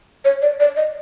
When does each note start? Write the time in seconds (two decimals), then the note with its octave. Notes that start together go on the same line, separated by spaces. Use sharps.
0.25 C#5
0.42 D5
0.60 D5
0.77 D#5